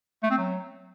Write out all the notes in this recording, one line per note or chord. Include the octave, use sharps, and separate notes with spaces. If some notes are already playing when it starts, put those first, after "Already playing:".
A3
C4
F#3